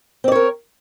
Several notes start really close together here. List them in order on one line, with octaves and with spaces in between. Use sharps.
C4 D5 C#5 A#4